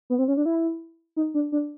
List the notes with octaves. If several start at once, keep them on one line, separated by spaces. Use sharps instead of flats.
B3
C4
C#4
D4
E4
D#4
D4
D4